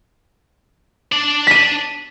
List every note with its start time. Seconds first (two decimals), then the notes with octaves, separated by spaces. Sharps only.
1.13 D4 D5
1.47 B6 D#7